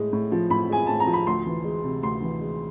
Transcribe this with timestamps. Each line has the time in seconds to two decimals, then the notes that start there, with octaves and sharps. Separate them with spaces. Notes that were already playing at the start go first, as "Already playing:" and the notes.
Already playing: A2 G#3
0.13 A2
0.32 F3
0.50 A2 B5
0.70 G#3 G#5
0.87 A2 A5
1.00 A#5
1.07 F3
1.13 B5
1.27 D2 C6
1.46 E3
1.64 G#3
1.84 C3
2.02 D2 C6
2.22 E3
2.41 G#3